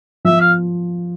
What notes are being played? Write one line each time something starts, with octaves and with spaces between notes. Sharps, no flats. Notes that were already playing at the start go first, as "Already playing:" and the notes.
F3 E5
F5